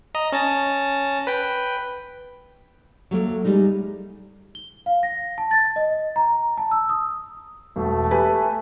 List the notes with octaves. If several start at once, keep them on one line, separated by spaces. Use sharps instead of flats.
D#5 A#5
C#4 A5 A#6
B4 G5
F#3 A3 A#3
G3 G#3 D#4
G7
F5
A#6
A5
A6
D#5
A#5
A5
E6
D#6
E1 A3
G4 B4 G#5